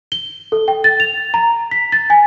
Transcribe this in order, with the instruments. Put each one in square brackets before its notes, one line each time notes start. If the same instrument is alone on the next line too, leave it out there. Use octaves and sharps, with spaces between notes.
[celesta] G7
A4
G5
A6
F7
A#5
B6
A6
G#5